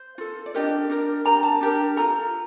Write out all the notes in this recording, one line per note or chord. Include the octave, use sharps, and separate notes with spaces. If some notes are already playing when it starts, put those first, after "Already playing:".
Already playing: C5
F4 A4
D5
D4 G4 A#4 D#5
D4 G4 A#4
D4 G4 A#4 A#5
A5
D4 G4 A#4
F4 A4 A#5